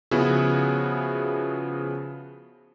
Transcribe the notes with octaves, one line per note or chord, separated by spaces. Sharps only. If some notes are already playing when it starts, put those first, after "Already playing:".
C#3 F3 B3 E4 F#4 G#4